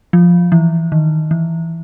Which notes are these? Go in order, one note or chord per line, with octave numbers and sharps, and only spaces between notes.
F3
E3
D#3
E3